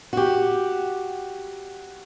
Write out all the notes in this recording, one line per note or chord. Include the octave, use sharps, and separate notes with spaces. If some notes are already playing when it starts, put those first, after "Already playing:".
F#4 G4